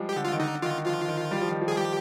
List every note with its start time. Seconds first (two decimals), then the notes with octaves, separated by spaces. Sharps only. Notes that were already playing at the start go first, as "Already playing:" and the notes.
Already playing: F3 G3 G#3
0.09 G4
0.16 D3
0.24 F4
0.33 D#3
0.39 D3 D#4
0.62 D#3 F4
0.85 F3 F4
1.08 D#3
1.31 G3
1.42 F3
1.51 D#3
1.62 F3
1.68 G#4
1.77 G3 G4